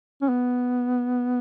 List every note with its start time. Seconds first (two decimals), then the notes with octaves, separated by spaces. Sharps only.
0.22 C#4
0.29 B3